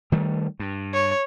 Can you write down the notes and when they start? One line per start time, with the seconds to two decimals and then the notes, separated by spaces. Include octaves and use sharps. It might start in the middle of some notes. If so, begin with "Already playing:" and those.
0.12 D#3 G3 A3
0.60 G2
0.93 C#5